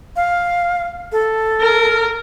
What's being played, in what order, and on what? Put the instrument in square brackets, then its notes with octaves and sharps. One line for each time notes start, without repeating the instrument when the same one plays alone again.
[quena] F5
A4
[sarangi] A#4